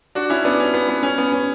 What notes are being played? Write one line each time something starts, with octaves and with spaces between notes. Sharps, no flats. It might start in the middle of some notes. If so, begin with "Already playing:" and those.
D4 F#4
C#4 E4
B3 D4
C#4
B3
B3
C#4
B3
C#4